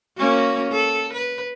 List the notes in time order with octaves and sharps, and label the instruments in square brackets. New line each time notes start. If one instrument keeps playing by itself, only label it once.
[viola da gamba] A#3 C#4 F#4
A4
B4